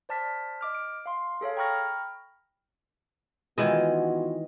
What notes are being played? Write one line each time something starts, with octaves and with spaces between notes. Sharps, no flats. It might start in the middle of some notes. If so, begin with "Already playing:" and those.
C5 D5 A5 F6 B6
D#5 D6 F6
D7
F5 C6
G#4 A4 C#5 F5
G5 A#5 B5 C#6 F6 A#6
D#3 E3 G#3 B3 F4 F#4 D#5